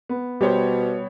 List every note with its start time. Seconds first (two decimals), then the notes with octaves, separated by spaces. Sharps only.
0.09 B3
0.41 B2 G3 B3 G4 C5 C#5